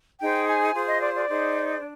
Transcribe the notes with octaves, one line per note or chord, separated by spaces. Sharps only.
D#4 G#4 C5 G5
G#5
F4 G#4 C5
D#5
D5
D5
D#4 G#4 C5
D4